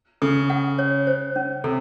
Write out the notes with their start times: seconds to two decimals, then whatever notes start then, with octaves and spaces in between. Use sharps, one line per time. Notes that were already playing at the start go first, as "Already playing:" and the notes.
0.22 C#3 A4
0.50 F#5
0.79 C#5
1.07 C5
1.36 C#4
1.64 C3 A4